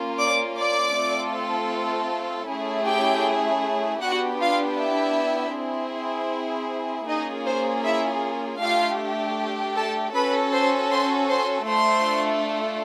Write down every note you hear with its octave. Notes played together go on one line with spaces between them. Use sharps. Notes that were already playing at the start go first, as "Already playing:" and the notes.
Already playing: A#3 C#4 F4
D5 D6
D5 D6
A3 C4 F4 A4
A3 C#4 E4 G#4
G4 G5
B3 D4 F#4 G4 F#5
F4 F5
E4 E5
C4 E4 G#4
A#3 C#4 D#4 F4 G#4 D#5
C5
E4 E5
A3 D4 F4 G4 F5
A4 A5
C#4 F#4 A4 B4 B5
C5 C6
C5 C6
C5 C6
A3 D4 F4 A4 C5 C6